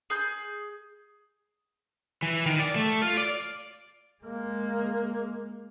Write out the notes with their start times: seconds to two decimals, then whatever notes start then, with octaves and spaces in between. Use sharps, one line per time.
0.10 G#4 G6
2.22 E3
2.46 D#3
2.59 D5
2.76 A3
3.02 F4
3.18 D5
4.24 G#3 A#3